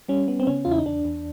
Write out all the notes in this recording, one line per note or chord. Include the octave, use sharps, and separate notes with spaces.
G3 C#4
B3
C4
C#3 C#4
E2 F4
E4
D#4
E2 D4
E2